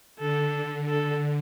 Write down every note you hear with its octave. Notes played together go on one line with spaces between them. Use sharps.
D3 A4
A4